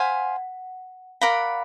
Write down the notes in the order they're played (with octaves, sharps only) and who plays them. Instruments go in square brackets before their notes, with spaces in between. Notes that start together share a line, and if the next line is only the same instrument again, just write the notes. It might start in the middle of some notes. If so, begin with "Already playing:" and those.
Already playing: [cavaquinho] C5 F5 G#5 [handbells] F#5
[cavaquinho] A#4 D5 F#5 B5 [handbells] F5